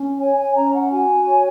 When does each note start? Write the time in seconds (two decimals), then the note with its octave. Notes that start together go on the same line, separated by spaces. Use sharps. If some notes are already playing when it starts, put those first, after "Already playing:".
Already playing: C#4
0.18 C#5 G#5
0.36 G#5
0.54 C#4 A#5
0.73 F#5
0.91 F#4 G#5
1.28 C#5